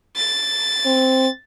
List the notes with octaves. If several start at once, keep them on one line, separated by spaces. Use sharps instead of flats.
A6
C4